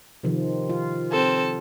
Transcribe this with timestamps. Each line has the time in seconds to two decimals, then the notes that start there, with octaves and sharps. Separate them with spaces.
0.24 C3 D#3 F3
0.69 F4
1.10 C4 A4